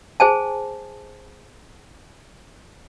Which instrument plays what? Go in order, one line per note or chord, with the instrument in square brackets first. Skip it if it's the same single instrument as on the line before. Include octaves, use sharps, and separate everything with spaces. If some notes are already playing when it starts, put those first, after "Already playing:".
[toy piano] G#4 C5 G#5 A5